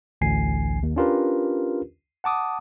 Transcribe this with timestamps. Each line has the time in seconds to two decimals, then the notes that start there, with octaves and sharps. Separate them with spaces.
0.21 A1 D2 G#5 C7
0.83 D#2
0.96 C#4 D4 F4 G4 A#4 B4
2.24 F#5 A5 D6 D#6